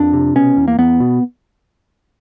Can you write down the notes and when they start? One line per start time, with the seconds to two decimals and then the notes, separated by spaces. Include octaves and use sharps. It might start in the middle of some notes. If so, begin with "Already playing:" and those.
Already playing: F2 D4
0.13 C3
0.36 B2 C#4
0.57 E2
0.68 A#3
0.78 E2 B3
1.00 B2